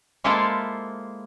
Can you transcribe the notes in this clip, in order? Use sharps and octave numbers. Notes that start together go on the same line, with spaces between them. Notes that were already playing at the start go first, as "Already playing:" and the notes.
G#3 A#3 E4 F4 A4 C5